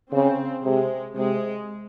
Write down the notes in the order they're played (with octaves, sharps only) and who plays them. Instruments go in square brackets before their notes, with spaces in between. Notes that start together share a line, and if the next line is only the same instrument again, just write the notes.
[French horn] C#3 [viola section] C4
[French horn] C3 [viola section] G#3
[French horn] C3 [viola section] G#3